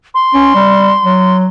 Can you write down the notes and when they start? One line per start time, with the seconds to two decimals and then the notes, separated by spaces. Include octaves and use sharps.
0.15 C6
0.34 C#4
0.55 G3
1.04 F#3